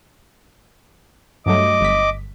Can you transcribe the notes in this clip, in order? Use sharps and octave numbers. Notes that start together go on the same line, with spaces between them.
G2 F#3 A3 D#5 D6
G1 B6